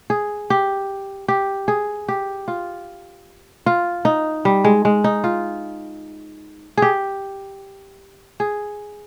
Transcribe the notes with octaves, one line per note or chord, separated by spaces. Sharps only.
G#4
G4
G4
G#4
G4
F4
F4
D#4
G3
G#3
G#3
D#4
F4
G4 G#4
G#4